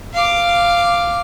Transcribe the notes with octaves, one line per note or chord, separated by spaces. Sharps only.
F5 D6